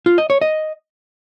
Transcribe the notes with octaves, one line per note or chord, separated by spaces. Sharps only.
F4
D#5
C#5
D#5